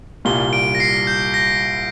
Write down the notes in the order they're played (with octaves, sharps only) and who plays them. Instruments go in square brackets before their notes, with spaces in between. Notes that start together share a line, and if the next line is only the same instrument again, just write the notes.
[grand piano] C2 A#2 G3 [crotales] G7
[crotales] D7
A#6
C7
G6
A#6